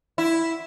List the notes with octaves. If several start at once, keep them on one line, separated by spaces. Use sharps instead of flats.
E4